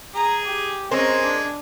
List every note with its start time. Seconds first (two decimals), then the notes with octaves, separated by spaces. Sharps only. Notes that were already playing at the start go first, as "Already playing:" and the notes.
0.15 G#4 A#5
0.45 G4
0.91 G#3 C4 C#4 A#4 C5
1.22 D4